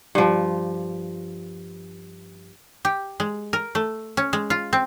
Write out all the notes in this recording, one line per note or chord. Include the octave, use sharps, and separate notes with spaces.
G2 F3
G4
G#3
A#4
A3
C#4
G#3
F4
C4